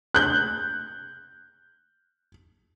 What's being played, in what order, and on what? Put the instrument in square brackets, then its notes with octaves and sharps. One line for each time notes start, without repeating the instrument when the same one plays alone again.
[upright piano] F#6 G6